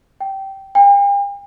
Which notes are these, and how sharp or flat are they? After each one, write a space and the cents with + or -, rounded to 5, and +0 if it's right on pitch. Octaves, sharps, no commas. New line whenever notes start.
G5 -15
G5 +45